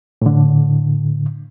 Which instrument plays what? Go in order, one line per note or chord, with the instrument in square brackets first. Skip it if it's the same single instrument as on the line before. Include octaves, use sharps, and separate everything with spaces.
[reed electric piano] A2 D3